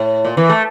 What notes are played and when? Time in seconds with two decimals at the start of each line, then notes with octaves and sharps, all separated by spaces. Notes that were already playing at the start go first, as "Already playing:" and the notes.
Already playing: A2
0.25 A#2
0.37 E3
0.49 A3